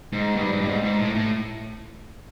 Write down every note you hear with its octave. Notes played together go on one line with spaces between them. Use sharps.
G#2
G2
G#2
G2
G#2
G#2
A2
A2